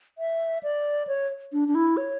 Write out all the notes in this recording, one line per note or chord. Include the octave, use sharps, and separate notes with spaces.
E5
D5
C#5
D4
D4
E4
C#5